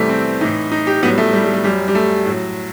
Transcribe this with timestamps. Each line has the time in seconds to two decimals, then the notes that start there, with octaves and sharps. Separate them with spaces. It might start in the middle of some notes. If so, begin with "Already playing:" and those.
Already playing: E2 C3 E3 G3 A3
0.09 C4
0.41 A2 E3 D#4
0.72 D#4
0.87 G4
1.02 A2 F#3 B3
1.11 G3
1.18 A3
1.33 G3
1.44 G3
1.54 A3
1.64 F#2 F#3 G3
1.88 G3
1.95 A3
2.26 A2 F#3